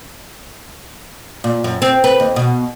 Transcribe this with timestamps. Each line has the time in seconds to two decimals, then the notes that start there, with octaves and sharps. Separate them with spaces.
1.44 A#2
1.64 F#2
1.82 C4
2.04 B4
2.20 D#2
2.36 B2